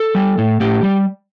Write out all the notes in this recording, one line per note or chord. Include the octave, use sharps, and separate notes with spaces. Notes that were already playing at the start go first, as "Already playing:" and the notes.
Already playing: A4
G3
A2
A2 G4
G3